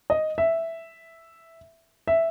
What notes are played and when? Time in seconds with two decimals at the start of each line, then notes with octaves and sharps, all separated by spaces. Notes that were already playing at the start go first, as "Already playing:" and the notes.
0.10 D#5
0.38 E5
2.08 E5